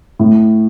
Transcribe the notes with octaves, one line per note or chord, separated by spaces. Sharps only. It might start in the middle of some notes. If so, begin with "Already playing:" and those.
A2